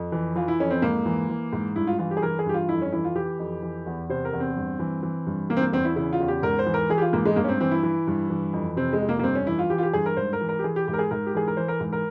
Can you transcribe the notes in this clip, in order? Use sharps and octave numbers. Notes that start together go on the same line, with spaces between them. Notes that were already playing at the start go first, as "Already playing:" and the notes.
Already playing: F2
E3
E3 F4
E4
F2 C#4
C4
G#2 A#3
E3
E3
G#2
G2 E4
F4
E3 F4
G4
G#4
E3 A#4
G#4
G2 G4
F4
F2 E4
C#4
E3 E4
F4
E3 G4
F2
E3
E2
C3 C5
A#4
E2
C4
G2
E3
E3
G2
E3 A#3
C4
A#3
E2 C4
E4
C#3 E4
F4
E2
G4
G#2 A#4
C5
E3
A#4
E3 G#4
G4
F4
G#2 A#3
G#3
G2 A#3
C#4
C4
E3 C4
E4
E3
G2
E3
F2
C3 C4
G#3
F2
A#3
A#3
G2 C4
C#4
E3 E4
F4
E3 G4
F4
G4
G2 G#4
A#4
G#2 C5
A#4
E3
A#4
G4
E3 G#4
G4
G#2 G4
A#4
G#4
G#2 A#4
G4
E3 G#4
A#4
E3 C5
A#4
G#2
A#4